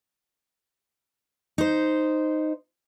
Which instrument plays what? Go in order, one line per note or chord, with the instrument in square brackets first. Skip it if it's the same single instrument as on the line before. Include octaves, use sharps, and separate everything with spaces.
[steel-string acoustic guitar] D#4 C5